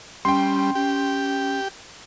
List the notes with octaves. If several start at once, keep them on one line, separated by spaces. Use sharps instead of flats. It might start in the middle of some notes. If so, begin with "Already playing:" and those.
G3 C#4 G5 C6
C#4 G4